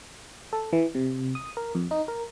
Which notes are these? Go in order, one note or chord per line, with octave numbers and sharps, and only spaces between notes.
A4
E3
C3
D#6
A#4
F2
D#4
A#4